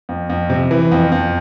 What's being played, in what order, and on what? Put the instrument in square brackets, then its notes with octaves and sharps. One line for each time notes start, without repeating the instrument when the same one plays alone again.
[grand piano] F2
F2
C3
E3
F2
F2